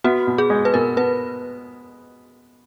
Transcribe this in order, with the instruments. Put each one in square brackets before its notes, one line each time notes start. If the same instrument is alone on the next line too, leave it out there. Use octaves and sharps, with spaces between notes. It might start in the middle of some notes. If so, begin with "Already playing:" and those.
[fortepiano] B3 [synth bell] F#4
[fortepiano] B2
[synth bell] G#4
[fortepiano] G#3
[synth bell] B4
[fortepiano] B2 [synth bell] A#4
[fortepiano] B3 [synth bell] B4